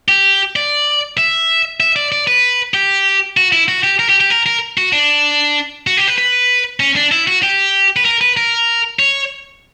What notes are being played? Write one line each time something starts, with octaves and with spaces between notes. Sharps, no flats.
G4
D5
E5
E5
D5
D5
B4
G4
F#4
E4
F#4
G4
A#4
G4
G4
A#4
A#4
F#4
D4
F#4
G4
B4
B4
C#4
D4
E4
F#4
G4
B4
A#4
B4
A#4
C#5